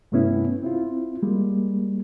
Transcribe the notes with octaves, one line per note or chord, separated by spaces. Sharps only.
G2 C3 A3 B3 C#4 E4
C4 E4 F4
G3 G#3 A#3